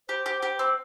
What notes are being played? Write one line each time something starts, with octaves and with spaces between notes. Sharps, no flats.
G4 C5
G4
G4
C4 C5